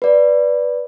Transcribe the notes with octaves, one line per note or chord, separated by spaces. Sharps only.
B4 D5